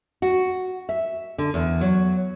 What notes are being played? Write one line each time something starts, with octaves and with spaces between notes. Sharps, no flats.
F#4
E5
D3
E2
F#3